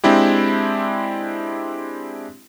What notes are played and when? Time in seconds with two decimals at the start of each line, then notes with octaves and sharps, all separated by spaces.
0.04 G#3 C4 D4 E4 G4